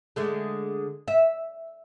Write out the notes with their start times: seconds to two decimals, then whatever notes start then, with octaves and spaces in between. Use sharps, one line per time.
0.16 D3 G#3 A3
1.08 E5